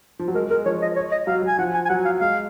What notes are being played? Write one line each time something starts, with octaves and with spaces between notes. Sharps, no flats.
F3
F#3
G#3 A#4
G#3 A#4
F3 C#5
D#5
C#5
D#5
F#3 F5
F#3
G#5
F3 F#5
G#5
G#5
F#3 F#5
F5
G#3 F5